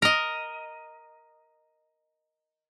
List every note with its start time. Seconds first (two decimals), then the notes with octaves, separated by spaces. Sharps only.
0.02 A#4 D#5